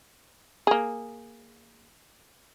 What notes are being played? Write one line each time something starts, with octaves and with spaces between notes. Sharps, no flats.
A#3 G#4